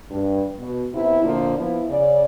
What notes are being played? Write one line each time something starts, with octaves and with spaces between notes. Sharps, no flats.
G2
B2
C3 B3 E4
F2 A#2 D3 F3 A#3
F3 B3 E4
C#3 D5